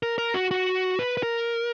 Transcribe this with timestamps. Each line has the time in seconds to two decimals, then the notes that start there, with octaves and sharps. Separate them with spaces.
0.03 A#4
0.18 A#4
0.34 F#4
0.51 F#4
0.99 B4
1.17 B4
1.23 A#4